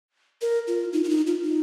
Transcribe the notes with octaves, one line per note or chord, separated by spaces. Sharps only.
A#4
F4
D#4
F4
D#4
F4
D#4